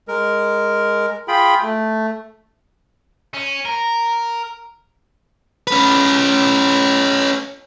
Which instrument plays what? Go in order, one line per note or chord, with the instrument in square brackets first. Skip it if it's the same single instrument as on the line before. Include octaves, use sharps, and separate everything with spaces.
[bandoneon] G#3 A#4
F4 G#4 G5 B5
A3
[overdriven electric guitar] C#4
A#4
[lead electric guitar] C#4 B4